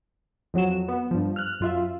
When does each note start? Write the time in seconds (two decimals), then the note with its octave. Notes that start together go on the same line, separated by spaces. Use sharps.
0.54 F2 F#3 F#4 E7
0.88 B3
1.11 G2 F3
1.36 F6 F#6
1.60 F#2 F4 E5